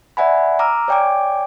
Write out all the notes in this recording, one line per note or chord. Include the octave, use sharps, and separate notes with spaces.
D5 E5 F#5 G#5 B5
A#5 D6 E6 F6
C#5 D5 G5 G#5 D6